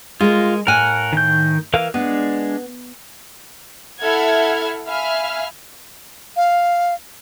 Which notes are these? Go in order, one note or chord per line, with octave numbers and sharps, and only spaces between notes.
G#3 F4 A#4
A2 A#4 F#5 G#5
D#3 G6
E3 A#4 F5
G#3 B3 D4
E4 A4 E5 F#5 F6 G#6
E5 F5 G#5 B5 F6
F5